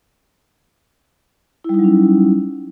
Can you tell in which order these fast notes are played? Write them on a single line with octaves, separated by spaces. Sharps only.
E4 G3 D#4 F#3 C#4